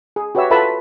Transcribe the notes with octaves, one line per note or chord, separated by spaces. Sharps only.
G#4
F#4 G4 B4 C#5 E5 E6
F4 A4 B4 E5 A5 B5